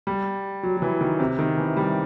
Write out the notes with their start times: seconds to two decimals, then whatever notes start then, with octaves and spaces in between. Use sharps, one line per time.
0.07 G3
0.63 F#3
0.77 F#3
0.82 E3
1.01 D#3
1.20 C3
1.39 D#3
1.57 E3
1.76 G3